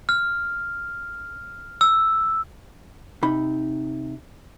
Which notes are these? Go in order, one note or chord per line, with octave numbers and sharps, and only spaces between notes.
F6
E6
C3 D#4 B5